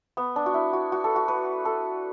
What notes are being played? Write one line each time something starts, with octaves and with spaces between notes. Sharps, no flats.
B3
D4
F#4
E4
F#4
F#4
A4
F#4
B4
A4